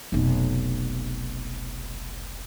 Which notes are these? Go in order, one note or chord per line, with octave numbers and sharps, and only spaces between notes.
F1 B1